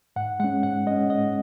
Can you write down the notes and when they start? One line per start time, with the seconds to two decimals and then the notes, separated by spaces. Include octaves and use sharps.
0.16 G#2 F#5
0.40 G#3 C#4 F#5
0.63 G#2 F#5
0.87 G#3 C#4 D#5
1.10 G#2 D#5